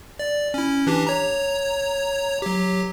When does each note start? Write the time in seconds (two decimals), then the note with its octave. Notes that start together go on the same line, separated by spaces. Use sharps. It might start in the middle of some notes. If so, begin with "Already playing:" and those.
0.19 D5
0.54 C#4 E4
0.87 E3 D4 G4
1.07 C#5 A#5
2.42 F#3 G4